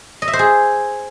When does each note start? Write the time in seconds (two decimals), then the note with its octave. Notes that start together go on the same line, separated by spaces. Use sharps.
0.22 D#5
0.28 E5
0.33 C5
0.39 G#4